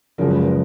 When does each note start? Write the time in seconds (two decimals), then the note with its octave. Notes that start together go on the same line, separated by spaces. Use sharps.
0.18 F#1 F#2 C#3 F3 G#3 A#4
0.30 B4
0.42 A#4